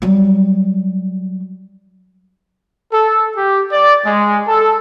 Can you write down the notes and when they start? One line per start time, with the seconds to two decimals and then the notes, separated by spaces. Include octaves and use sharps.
0.02 F#3 G3
2.93 A4
3.36 G4
3.72 D5
4.06 G#3
4.47 A4